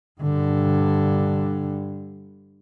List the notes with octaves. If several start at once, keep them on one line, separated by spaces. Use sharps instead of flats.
G2 D3